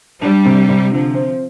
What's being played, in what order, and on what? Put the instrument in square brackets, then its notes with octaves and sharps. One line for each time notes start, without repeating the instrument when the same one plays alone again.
[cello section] G3 [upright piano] D4
[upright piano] C3
C3
[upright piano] D3 [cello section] F3
[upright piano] C4